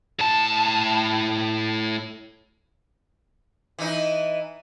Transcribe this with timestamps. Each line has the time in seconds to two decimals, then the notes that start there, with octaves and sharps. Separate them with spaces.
0.19 A2 A5
3.79 E3 D#4